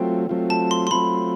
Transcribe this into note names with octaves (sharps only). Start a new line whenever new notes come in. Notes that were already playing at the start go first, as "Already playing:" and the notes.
Already playing: F#3 A3 C4 F4 G5
F#3 A3 C4 F4
A5
C6
C6
F#3 A3 C4 F4 B5